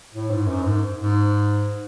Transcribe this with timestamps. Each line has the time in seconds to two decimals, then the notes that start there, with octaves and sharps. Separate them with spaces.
0.15 A2
0.30 G#2
0.47 F#2
0.64 G#2
1.01 G#2